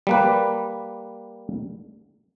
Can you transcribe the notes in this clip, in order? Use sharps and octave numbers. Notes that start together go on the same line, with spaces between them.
G3 A#3 B4